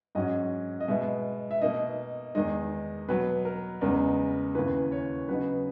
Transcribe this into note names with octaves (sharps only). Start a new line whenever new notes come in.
G#2 F#3 C#4 D#5
D#5
B2 G#3 B3 E5
E5
B2 A#3 D#4 D#5
E2 D#3 G#3 D#4 D#5
B2 F#3 B3 B4
A#4
E2 C#3 G#3 B3 D#4 A#4
D#2 C#3 E3 B4
C#5
C#3 F#3 B3 D#4 B4